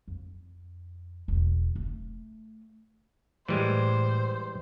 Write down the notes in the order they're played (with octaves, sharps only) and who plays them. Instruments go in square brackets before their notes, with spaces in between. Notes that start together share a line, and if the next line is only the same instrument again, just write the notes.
[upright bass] F2
E1
A3
[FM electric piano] A2 [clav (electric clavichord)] E3 G3 G#3 [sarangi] C5